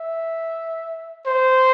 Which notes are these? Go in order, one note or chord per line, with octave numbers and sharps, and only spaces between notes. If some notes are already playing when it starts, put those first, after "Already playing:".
Already playing: E5
C5